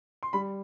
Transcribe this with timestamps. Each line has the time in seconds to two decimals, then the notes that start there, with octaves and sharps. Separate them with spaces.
0.23 C6
0.33 G3 B5